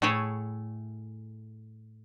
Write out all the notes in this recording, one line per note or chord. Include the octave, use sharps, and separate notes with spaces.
A2 A3 E4 G#4 A4 C#5